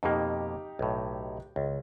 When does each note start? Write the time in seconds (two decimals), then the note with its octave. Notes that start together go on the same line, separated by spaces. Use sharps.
0.03 F2 B2 A#3 D#4 G4
0.79 B1 A2
1.56 C#2